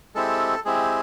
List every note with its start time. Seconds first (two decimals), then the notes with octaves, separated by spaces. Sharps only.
0.15 G#3 C4 E4 G4 A4
0.65 G#3 C4 E4 G4 G#4